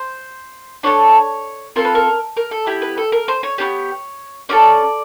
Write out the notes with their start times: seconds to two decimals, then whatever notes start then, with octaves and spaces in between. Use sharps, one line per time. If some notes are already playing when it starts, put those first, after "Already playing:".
Already playing: C5
0.83 D4 F#4 A4 C#5
1.76 C4 F4 A4 A#4
1.85 B4
1.95 A#4
2.37 A#4
2.51 A4
2.66 B3 E4 G4
2.82 B4
2.97 A4
3.12 A#4
3.28 C5
3.43 C#5
3.58 B3 D4 G4 C#5
4.49 C#4 F#4 A4 D5